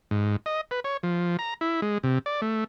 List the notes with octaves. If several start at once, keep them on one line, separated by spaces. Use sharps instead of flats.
G#2
D#5
B4
C#5
F3
A#5
E4
G#3
C3
D5
A3